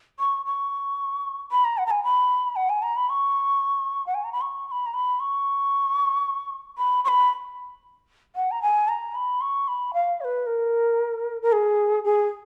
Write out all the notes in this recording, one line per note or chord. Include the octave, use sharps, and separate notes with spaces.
C#6
C#6
B5
A#5
F#5
A#5
G#5
B5
F#5
G#5
A#5
B5
C#6
F#5
G#5
A#5
B5
C#6
C#6
B5
A#5
B5
C#6
B5
C#6
B5
F#5
A#5
G#5
A#5
B5
C#6
B5
F5
C#5
B4
A#4
A#4
G#4
G#4